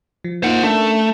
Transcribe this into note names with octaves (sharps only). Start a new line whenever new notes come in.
F3
A#3 D#4 F4 C5 F#5
A3 C#4 D4 A#4